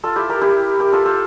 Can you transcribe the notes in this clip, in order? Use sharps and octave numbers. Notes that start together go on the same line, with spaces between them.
F4 A4
E4 G4
G4 A#4
E4 G4
G4 A#4
F4 A4
F4 A4